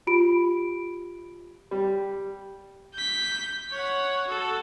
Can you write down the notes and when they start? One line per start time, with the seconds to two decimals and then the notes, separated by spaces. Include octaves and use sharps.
0.07 F4 G4 B5 D7
1.71 G3
2.94 G6 B6
3.71 C#5 F#5
4.28 F#4 A4